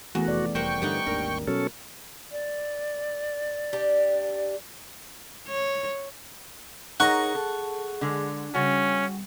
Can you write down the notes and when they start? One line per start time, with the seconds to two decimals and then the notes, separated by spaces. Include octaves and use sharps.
0.15 E2 A3 B3 F#4
0.28 F1 D5
0.55 F1 G3 A#4 C5 F#5 G5 C#6
0.82 G2 D3 E3 G3 D#4 F#5
1.07 G#1 D#2 D4 A#4
1.47 B2 F#3 C#4 A4
2.32 D5
3.73 D4 G4
5.48 C#5
7.00 D#4 G#4 A#4 C#5 F#5 C#6
7.35 A4
8.01 D3 G#3
8.55 C#3 G3 C#4 F#4